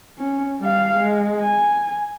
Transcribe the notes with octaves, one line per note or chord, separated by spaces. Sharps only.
C#4
G3 F5
G#3
G#5